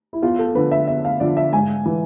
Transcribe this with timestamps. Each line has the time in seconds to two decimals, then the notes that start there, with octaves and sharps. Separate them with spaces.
0.13 E4
0.22 E2 F4
0.39 A4
0.55 D3 F3 B4
0.71 E5
0.88 E2 E5
1.05 F5
1.20 D3 F3 D5
1.37 E5
1.53 G#2 G#5
1.85 E3